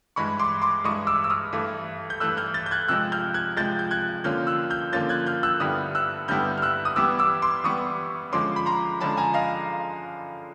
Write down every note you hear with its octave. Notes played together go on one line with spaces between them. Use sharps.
G2 E3 G#3 B5 C#6
C6 D6
C6 D6
G2 E3 G#3 C#6 D#6
D6 E6
E6
D#6 F6
G2 E3 A3
G6
G2 E3 A3 E6 F#6
F6 G6
G6 A6
G6
F#6 G#6
C3 F3 G#3 E6 F#6
F6 G6
F#6 G#6
C3 F3 G#3 G6 A6
G6
F#6 G#6
D3 F3 A#3 C#4 F4 F6 G6
E6 F#6
F6 G6
D3 F3 A#3 C#4 F4 G6 A6
F#6 G#6
F6 G6
E6 F#6
G2 D3 G3 B3 E4 D#6 F6
E6 F#6
G2 D3 G3 B3 E4 F6 G6
F6
E6 F#6
D#6
E3 G3 B3 D6 E6
D6 E6
C6 D6
E3 G3 B3 C#6 D#6
D3 F3 G#3 C#4 C6 D6
B5
A#5 C6
D3 F3 G#3 C#4 A5 B5
G#5 A#5
D#5 F5